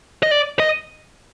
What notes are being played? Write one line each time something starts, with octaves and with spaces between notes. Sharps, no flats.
D#5
D5
D#5